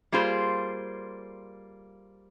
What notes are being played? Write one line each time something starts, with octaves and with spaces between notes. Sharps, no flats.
G3 A#3 F4 G#4 C5